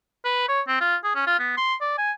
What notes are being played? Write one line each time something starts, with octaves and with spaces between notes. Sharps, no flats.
B4
C#5
C4
F4
G#4
C#4
F4
B3
C6
D5
G#5